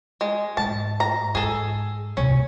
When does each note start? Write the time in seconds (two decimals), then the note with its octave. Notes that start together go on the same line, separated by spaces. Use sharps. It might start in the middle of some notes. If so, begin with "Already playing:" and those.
0.21 G#3
0.57 G#2 A5
1.00 A#5
1.35 G#2 G#4 A4
2.17 D#1 C2 C#4